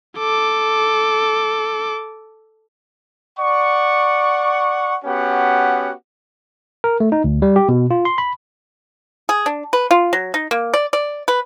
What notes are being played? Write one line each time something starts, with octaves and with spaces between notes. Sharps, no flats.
A4 D6
D5 F#5 C#6
B3 C#4 F#4 G4 F#5
A#4
A3
D#4
D2
G3
G4
B2
F4
C6
B5
G#4
D4
B4
F4
F#3
D#4
A#3
D5
D5
B4